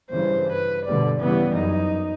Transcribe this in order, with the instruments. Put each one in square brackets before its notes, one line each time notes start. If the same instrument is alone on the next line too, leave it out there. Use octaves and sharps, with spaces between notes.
[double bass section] G2 C#3 E3 [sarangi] C5
[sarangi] B4
[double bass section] B2 D3 G3 [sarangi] D5
[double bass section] C#3 E3 G3 [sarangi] B3
[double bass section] F#2 [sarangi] D#4